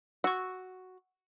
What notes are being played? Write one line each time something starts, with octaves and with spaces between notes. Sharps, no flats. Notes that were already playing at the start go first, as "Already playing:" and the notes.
F#4 C#6 E6